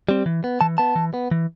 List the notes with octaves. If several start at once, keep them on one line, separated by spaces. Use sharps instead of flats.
G3 C4
E3
B3
E3 A5
B3 A5
E3
B3
E3